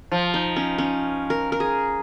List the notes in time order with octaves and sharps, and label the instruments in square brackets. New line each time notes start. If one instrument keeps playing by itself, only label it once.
[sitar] F3
[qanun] D#4
C#4
C#4
A#4
A#4
G#4